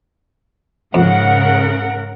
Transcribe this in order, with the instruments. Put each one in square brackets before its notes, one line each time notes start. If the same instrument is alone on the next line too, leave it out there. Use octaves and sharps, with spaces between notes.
[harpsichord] F2 [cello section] G#2 C#3 A#4 [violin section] F#5